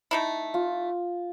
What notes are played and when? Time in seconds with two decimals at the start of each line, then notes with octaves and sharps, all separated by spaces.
0.11 A3 D#4 E4
0.54 F4